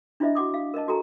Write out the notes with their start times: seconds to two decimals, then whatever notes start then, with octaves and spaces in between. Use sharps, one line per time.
0.20 D4 E4 F4 C5 D#5 E5
0.35 F#4 F#5 D6 D#6
0.54 F5
0.74 A#4 B4 D#5 A5
0.88 F#4 G4 A4 G#5 A#5